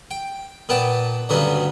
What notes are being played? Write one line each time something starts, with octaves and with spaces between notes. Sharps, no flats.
G5
A#2 B3 G5 A5
D2 G2 C#3 F#3 B3